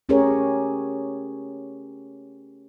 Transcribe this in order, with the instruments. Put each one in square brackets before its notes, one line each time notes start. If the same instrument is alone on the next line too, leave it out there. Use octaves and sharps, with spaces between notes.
[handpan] A3 C#4 G4 G#4 A#4 C#5